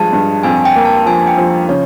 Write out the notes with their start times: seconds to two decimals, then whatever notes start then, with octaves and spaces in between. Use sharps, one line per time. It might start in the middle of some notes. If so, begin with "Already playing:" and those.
Already playing: G2 F3 G#3 A5
0.13 G2
0.43 F2 G#5
0.65 G5
0.76 A#3
0.85 A5
1.06 F3 G#5
1.27 G5
1.38 F3
1.68 C#3 C#5